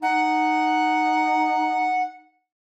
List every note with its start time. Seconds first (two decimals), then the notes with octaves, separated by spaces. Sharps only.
0.02 D#4 F#5